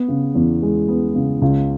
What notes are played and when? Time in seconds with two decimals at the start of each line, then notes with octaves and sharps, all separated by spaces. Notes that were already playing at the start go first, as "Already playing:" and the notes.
Already playing: B3
0.08 C#3
0.35 E2
0.62 G#3
0.88 B3
1.15 C#3
1.42 C#2